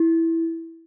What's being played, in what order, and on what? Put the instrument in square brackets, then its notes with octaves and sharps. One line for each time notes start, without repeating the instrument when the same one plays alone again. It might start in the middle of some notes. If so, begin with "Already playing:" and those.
Already playing: [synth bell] E4